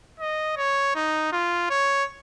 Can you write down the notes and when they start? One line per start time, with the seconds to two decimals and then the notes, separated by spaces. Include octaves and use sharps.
0.20 D#5
0.57 C#5
0.95 D#4
1.32 F4
1.70 C#5